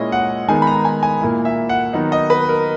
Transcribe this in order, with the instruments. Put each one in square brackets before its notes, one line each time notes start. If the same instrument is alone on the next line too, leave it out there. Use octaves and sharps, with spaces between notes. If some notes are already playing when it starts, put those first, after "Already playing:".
Already playing: [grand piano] A#2 G#3 C#4 E4 D#5
F#5
D#3 G#3 B3 D#4 G#5
B5
A#5
G#5
G#5
A#2 A#3 E4
E5
F#5
D#3 F#3 B3 D#4
D#5
B4
A#4